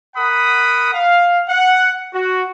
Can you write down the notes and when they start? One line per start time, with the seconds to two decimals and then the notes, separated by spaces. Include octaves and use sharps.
0.15 A#4 F#5 B5 D#6
0.93 F5
1.48 F#5
2.13 F#4